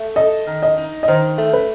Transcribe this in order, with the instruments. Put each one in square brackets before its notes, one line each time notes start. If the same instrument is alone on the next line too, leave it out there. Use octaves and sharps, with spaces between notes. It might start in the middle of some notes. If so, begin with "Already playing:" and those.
Already playing: [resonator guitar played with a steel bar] A3
[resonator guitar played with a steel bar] A4 [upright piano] D#5
[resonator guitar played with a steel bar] D#3
[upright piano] D#5
[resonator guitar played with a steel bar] D#4
[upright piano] D#5
[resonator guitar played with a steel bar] D#3 [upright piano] C5
[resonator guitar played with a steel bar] A3
[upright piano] B4